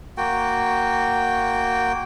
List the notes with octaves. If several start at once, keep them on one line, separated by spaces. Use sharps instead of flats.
A#3 F#4 G5